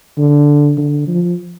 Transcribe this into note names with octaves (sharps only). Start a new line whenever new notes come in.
D3
D3
F3